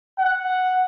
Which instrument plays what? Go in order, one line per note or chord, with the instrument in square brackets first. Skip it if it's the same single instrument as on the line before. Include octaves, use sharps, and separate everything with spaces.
[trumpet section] F#5